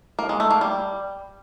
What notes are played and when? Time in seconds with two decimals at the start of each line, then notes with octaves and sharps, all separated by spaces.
0.19 A#3
0.29 G#3
0.40 A3
0.51 A#3
0.61 G3